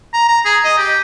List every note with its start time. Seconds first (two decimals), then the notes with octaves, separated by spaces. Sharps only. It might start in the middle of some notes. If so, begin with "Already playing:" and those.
0.14 A#5
0.28 A#5
0.45 G#4
0.64 D#5
0.78 G4